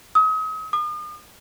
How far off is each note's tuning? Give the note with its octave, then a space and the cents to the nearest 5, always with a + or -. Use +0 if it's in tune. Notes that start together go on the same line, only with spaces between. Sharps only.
D#6 +40
D#6 -40